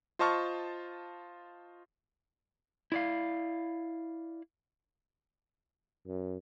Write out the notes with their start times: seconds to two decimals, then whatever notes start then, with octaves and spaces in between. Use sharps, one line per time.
0.19 F4 C5 D#5 A5 C#6 F6
2.92 E4 D5 F5
6.07 F#2